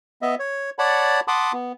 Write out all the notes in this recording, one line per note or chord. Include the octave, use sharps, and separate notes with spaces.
B3 D#5 E5
C#5
C#5 D5 F#5 A5 B5
F#5 A5 B5 C6 D6 D#6
B3